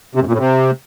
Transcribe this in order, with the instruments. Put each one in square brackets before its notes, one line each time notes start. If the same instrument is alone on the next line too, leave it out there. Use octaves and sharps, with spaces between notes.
[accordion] C3
F#2
A#2
A2
C3